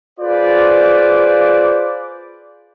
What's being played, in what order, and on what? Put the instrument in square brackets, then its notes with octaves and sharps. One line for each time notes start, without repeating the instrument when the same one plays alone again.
[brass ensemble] F4 G#4 B4 C5 D5